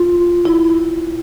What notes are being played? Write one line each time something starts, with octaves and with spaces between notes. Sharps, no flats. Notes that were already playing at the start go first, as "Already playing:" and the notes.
Already playing: F4
E4